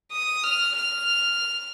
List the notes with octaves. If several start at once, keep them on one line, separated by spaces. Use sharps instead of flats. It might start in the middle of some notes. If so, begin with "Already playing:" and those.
D#6
F6
F6